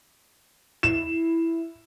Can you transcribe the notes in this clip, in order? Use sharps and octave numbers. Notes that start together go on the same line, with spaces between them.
E4 E7